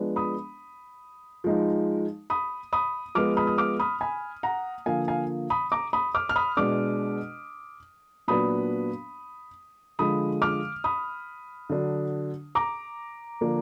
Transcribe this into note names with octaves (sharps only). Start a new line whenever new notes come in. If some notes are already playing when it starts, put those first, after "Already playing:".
Already playing: F3 G#3 B3 D4
B5 D#6
F3 G#3 D#4
B5 D#6
B5 D#6
F3 G#3 B3 D6 F6
B5 D#6
D#6
D6 F6
B5 D#6
G#5 B5
F#5 A#5
D3 F3 A#3 F5 G#5
F5 G#5
B5 D#6
A#5 D6
B5 D#6
D6 F6
F6
B5 D#6
B2 G#3 D4 D6 F6
A#2 F#3 B3 D4 B5 D#6
D3 F3 G#3 B5 D#6
D6 F6
B5 D#6
D3 F#3 D4
A#5 D6
D3 F3 A#3 D4